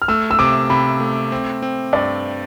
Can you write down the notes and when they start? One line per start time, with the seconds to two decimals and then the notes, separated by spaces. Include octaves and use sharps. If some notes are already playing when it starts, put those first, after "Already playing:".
0.02 F6
0.08 A3 E6
0.31 E6
0.39 C3 D6
0.70 C3 B5
1.00 A3
1.32 C4
1.62 C4
1.93 G2 D5